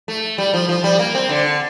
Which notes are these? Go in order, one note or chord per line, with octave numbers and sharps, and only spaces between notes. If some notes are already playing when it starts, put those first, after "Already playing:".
A3
G3
F3
F3
G3
A#3
C4
D3